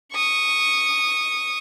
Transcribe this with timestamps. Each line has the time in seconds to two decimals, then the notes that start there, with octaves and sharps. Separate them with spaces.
0.13 C#6 D#6